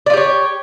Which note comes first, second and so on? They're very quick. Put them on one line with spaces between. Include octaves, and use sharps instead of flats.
D5 F4 G4 C#5